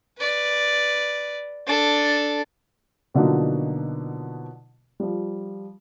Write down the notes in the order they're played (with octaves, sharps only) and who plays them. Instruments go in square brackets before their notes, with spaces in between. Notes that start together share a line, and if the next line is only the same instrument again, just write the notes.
[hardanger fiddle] B4 D5
D4 A4
[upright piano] B2 D3 F3 F#3 A#3 D#4
F3 G3